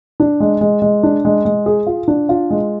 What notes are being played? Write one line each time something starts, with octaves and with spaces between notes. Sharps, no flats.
D4
G#3
G#3
G#3
D4
G#3
G#3
G#4
F4
D4
F4
G#3